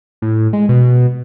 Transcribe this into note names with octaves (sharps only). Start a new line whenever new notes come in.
A2
G#3
B2